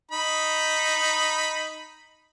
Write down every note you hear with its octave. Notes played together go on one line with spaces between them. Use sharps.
D#4 B5